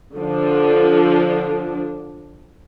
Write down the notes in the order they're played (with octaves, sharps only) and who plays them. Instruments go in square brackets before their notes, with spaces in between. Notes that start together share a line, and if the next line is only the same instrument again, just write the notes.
[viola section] D3 F3 D4